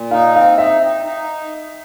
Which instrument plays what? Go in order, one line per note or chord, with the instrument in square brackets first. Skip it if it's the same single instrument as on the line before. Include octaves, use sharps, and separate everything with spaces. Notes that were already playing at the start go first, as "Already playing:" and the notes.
Already playing: [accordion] A#2
[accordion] D#4 [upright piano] F5
[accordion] C4 [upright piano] F5
[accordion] D#4 [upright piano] E5
[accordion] D#4
D#4